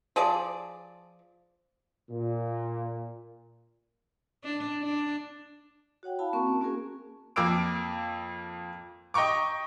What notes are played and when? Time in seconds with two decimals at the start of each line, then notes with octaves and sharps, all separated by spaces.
0.16 F3 G#4 D5
2.10 A#2
4.44 D4
4.81 D4
6.03 F#4 C#5 F#5 G5
6.19 E4 F5 A5 B5
6.33 A#3 C4 F#4 A#4 A5 C#6
6.47 C#4
6.61 A#3 C#4 F#4 G#4 A#4 G#5
7.36 F2 A#3 D6 E6 D7
9.14 D#5 G5 A#5 C#6 D6